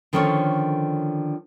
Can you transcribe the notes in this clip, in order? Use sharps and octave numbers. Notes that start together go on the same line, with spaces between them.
D3 D#3 F3 C#4 A4 C#5